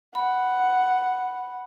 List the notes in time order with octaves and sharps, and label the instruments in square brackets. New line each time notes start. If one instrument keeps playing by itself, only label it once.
[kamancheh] F#5 [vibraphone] B5